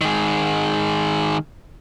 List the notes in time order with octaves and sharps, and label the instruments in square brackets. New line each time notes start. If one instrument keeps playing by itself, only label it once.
[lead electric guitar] D#3 G#3